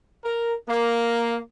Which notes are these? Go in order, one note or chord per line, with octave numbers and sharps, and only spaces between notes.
A#4
A#3